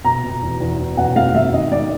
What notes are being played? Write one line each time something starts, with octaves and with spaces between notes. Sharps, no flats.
B2 A#5
B2
E2
E2
E2
B2 F#5
G#3 F5
G#3 E5
D#3 D#5
G#2 D5